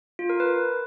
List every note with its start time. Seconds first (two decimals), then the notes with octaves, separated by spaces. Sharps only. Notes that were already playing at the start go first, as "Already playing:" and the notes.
0.19 F4
0.29 A#4
0.40 B4